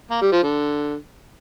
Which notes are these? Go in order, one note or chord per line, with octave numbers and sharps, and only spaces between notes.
A#3
G3
F3
D3